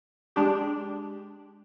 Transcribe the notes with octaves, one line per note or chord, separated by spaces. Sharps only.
G#3 D4 G4